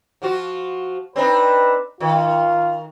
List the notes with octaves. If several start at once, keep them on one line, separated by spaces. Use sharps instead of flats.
F3 F4 F#4
C4 D4 D#4 B4
D#3 F4